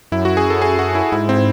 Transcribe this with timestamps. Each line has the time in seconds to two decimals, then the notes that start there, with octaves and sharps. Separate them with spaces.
0.12 F#2 E4
0.25 F#4
0.37 G#4
0.50 A4
0.62 G#4
0.79 F#4
0.95 E4
1.12 G#2 E4
1.29 C4